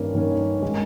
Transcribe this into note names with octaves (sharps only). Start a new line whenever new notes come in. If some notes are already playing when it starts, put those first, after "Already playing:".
Already playing: G2 D#3 A#3 C#4
G2 D#3 A#3 C#4
D#3 G#3